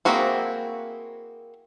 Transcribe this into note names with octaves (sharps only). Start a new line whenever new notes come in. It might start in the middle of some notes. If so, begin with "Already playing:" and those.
A#3 C4 E4 F#4 G#4